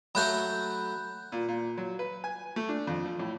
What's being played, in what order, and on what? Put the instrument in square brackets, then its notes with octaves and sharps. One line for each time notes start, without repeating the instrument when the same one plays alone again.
[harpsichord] F#3 A3 F#4 [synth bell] B5 F#6 G6
[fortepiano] A#2
A#2
F#3
B4
G#5
A3
D4
F2
F3
A2